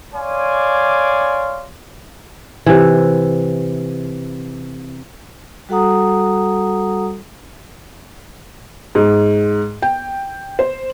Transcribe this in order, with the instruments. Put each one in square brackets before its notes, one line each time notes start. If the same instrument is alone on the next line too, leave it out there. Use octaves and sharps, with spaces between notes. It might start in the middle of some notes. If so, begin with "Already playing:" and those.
[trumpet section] C#5 D5 F5 G#5 C6 D6
[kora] C3 E3
[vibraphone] G3 F#4 A4 F#5 A#5 D#6
[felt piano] G#2
G5
C5